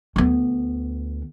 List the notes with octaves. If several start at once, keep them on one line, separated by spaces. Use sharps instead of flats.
D2 B3